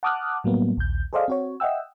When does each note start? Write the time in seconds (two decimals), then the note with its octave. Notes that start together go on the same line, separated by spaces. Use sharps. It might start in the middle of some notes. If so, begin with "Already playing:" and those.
0.03 F#5 A5 D6 D#6 F6 F#6
0.44 A2 F#3 G3 A#3 B3
0.77 A#1 D#2 G6
1.13 G#4 A4 C5 D5 D#5 F5
1.28 C4 F#4 C#5
1.60 D#5 E5 F#5 G5 E6